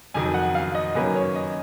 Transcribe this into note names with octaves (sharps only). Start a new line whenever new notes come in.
F2 D#3 F#3 G#5
F#5
F5
D#5
F#2 D#3 A#3 C#4 B4
C#5
D#5